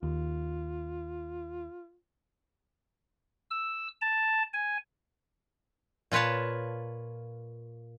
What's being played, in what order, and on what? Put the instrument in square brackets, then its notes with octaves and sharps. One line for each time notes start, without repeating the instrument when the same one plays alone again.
[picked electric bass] D#2 [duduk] F4
[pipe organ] E6
A5
G#5
[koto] A#2 F4 B4 C#5 A5